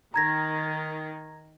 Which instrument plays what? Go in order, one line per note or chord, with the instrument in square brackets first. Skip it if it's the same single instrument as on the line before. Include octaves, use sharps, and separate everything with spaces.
[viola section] D#3 [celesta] A#5 G#6 A#6